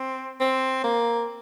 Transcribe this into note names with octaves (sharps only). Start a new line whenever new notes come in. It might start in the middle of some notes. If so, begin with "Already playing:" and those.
Already playing: C4
C4
A#3